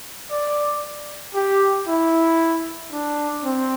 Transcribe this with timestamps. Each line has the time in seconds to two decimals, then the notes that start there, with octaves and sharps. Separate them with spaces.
0.31 D5
1.34 G4
1.88 E4
2.92 D4
3.44 C4